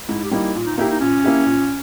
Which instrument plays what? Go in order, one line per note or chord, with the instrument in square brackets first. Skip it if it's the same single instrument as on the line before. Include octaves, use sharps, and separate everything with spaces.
[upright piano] G#2 [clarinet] E4
[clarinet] G4
[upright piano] G3 A#3 D#4 [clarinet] E4
[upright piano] A#2
[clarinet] D#4
[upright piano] A#3 E4 G4 [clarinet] D#4
[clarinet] D#4
[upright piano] A#2 [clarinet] C#4
[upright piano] A#3 E4 G4
A#2